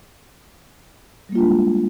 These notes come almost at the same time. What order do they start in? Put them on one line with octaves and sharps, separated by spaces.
G3 A#3 F4 D4 G#3